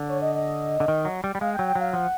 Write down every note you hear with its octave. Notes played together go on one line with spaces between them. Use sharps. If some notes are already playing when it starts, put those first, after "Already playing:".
Already playing: D3
C#5
D#5
D#5
D3
D#3
F#3
G3
G3
G#3 F5
G5
F#3
G5
F#3
F5
F3 F#5